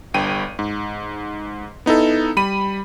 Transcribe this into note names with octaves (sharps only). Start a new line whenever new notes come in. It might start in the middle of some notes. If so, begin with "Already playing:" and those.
G1 G2 G5 D#7
G#2
B3 D#4 E4 A4
G3 B5 D#7